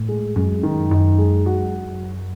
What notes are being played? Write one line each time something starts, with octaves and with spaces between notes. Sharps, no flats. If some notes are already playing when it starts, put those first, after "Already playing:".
Already playing: A2
G#3
F#2 G#3
D#3
F#2 D#4
G#3
F#4